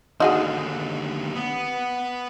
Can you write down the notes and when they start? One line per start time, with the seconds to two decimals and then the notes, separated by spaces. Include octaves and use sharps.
0.20 D#2 D3 D#4 F#4 G#4
1.35 B3